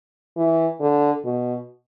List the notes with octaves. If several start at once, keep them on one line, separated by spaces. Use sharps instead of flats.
E3
D3
B2